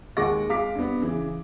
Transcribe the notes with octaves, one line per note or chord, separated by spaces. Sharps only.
D#2 G#3 F#5 C#6 D6 A#6
G#3 F5 D6 B6
G2 B3
C#3 E3